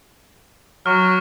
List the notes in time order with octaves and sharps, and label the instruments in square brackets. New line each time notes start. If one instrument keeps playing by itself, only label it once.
[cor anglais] F#3 [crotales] C#6 F6